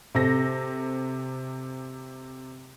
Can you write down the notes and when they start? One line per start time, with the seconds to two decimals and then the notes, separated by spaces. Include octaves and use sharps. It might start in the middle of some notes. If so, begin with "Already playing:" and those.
0.15 C3 A4 A#6